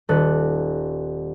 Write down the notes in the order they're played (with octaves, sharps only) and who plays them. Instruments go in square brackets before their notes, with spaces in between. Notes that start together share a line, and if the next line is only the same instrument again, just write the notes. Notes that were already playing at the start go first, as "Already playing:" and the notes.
[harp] D#1 A4 F#6